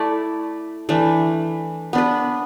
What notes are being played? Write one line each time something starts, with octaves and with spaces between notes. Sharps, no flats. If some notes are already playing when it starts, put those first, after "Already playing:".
Already playing: A3 E4 D5
E3 A3 D4
B3 D4 B4